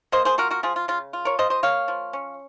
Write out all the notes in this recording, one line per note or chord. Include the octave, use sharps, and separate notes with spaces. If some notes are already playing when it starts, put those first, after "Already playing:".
A#3 C5 D#5
G#4 C5
F4 F#4 A#4
F#4 A#4
F3 F4 G#4
F4
C#3 F4
F4
A#4 C#5
F3 C5 D#5
C5 D#5
A#3 C#5 F5
F3
C#4